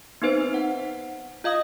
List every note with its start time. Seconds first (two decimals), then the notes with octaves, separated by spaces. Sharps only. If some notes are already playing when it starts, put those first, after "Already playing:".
0.22 B3 C4 D#4 B4 C5
0.54 F#5
1.44 F4 D#5 F5 D#6